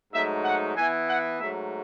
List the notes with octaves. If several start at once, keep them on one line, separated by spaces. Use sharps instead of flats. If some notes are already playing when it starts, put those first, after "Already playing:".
G#2 F#3 A3 D#4 E5
F#5
E3 B3 E4 G#5
F#5
G#2 F#3 A3 E5